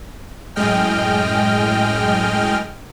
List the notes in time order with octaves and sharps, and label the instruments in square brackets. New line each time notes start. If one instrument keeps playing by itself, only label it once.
[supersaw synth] F#2 A2 G#3 D#5 G5 F6